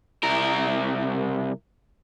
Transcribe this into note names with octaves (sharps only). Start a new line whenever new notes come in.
C2 A#4